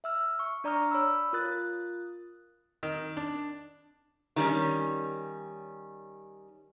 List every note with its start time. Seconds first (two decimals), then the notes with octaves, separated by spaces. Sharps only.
0.04 E5 E6 F6
0.39 C#6
0.64 D4 D5 A#5 C#6 D#6 F6
0.91 C#5 B5 E6
1.33 F4 A#4 D#6 F#6 A6
2.83 D#3
3.17 D4
4.36 D#3 G3 C#4